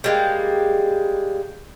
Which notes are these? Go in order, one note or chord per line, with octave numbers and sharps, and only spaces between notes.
G3 G#3 A#3